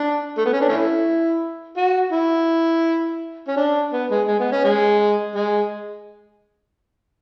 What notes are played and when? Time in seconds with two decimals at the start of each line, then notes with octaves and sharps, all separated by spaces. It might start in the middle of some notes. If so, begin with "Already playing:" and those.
Already playing: D4
0.38 A3
0.45 B3
0.53 C#4
0.61 D4
0.69 A3 C#4 E4
1.77 F#4
2.12 E4
3.48 C#4
3.56 D4
3.92 B3
4.10 G#3
4.28 G#3
4.40 B3
4.52 C#4
4.64 G#3
5.35 G#3